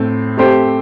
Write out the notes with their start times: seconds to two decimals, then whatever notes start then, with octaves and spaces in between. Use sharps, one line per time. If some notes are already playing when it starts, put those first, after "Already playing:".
Already playing: A2 C4
0.37 A3 C4 G4 C5